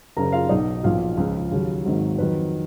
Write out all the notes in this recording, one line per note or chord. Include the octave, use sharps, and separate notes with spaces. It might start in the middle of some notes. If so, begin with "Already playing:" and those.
F#1 F#2 C#3 A#4 A#5
F4 F5
B1 B2 F#3 D#4 D#5
B1 A#2 F3 F4 F5
C#2 C#3 F3
D#2 C#3 F#3
G#1 G#2 D#3 F#3
F2 D#3 F#3 B4